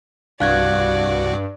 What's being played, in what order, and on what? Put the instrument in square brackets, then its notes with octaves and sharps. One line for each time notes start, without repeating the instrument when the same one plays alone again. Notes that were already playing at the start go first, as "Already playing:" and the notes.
[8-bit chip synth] C2 F#4 [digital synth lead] G2 [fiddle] D5 [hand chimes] F5 F#6 G#6